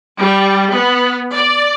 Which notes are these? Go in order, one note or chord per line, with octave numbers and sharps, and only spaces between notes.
G3
B3
D5